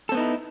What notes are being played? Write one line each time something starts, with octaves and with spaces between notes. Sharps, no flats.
B3 C4 D#4 E4 A4